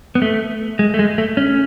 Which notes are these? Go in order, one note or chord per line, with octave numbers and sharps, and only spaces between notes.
B3
A3
G#3
A3
G#3
A3
C#4